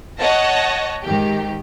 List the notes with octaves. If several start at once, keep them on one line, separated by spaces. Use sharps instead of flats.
C#5 D#5 F#5 A5 A#6
G#2 D#3 G4